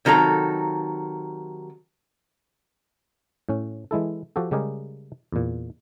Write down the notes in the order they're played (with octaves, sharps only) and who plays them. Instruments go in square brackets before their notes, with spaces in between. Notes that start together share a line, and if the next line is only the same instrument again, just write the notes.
[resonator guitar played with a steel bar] C3 D#3 F#3 A4 A#5
[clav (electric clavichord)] A2 C#4
E3 G#3 E4 A4
F3 F#4 G4 A4
C#3 G3 G#3 G4 G#4 A#4
E2 A#2